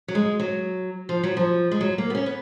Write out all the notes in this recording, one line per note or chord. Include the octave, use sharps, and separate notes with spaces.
F#3
G#3
F#3
F3
F#3
F3
G#3
F#3
A#3
B3
C#4
B3